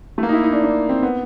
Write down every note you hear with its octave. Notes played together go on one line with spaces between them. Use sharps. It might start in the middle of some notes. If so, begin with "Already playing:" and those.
A3
A#3
D#4
E4
D#4
D4
D4
C4
B3